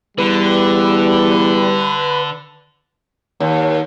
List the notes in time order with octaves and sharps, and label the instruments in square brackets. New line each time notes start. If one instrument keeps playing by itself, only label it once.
[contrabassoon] E2 [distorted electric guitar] D3 [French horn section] G3 [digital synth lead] B4
[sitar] D#2